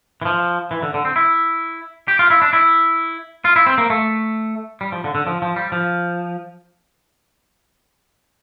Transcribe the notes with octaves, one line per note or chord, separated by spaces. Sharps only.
E3
F3
E3
D3
D3
C4
E4
G4
F4
E4
D4
E4
F4
E4
C4
A#3
A3
G3
F3
D3
D3
F3
F3
G3
F3